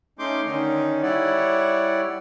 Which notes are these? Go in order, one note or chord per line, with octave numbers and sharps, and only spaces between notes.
A3 C#4 D#4 C6 D6 G6
D3 D#3 C#4 D#4
G3 E4 C#5 D5 F#5